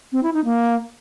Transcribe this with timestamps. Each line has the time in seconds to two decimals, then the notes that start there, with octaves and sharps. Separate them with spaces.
0.12 C4
0.23 E4
0.34 D#4
0.45 A#3